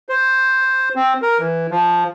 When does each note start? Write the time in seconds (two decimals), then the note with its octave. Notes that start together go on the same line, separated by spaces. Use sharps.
0.09 C5
0.96 C4
1.22 A#4
1.39 E3
1.71 F3